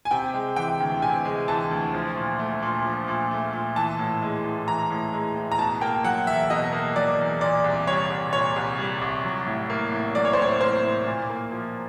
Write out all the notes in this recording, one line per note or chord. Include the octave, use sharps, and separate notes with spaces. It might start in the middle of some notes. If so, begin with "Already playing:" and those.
G#5
C3 G5
G#3
E3 G5
D2
C3 G#5
G#3
E3 A5
D2
F3
A#2
A3
A#2
F3
A#2
A3
A#2
E3 A5
A2
G#3
A2
E3 A#5
A2
G#3
A2
A#5
B2 A5
A#3 G5
F#3 F#5
E2 E5
B2 D#5
A#3
F#3 D5
E2
A#2 D5
C2
G3 C#5
C2
A#2 C#5
C2
G3
C2
F#3
A2
A#3
A2
F#3 D5
C#5
C5
A2 C#5
A#3 C5
A2
A#2
A#3
F3